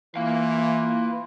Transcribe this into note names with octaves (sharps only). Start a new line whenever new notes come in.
E3 A#3 F4 B4 F5